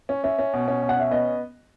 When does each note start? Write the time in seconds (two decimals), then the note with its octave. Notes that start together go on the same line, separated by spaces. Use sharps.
0.09 C#4
0.23 C#4 E5
0.39 C#4
0.53 B2
0.68 C#4
0.83 B2
0.89 F#5
0.96 C#4 E5
1.11 B3 D#5